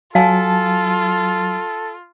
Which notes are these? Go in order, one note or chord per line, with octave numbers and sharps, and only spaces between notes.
F#3 F4 A4 F5 G#5 A5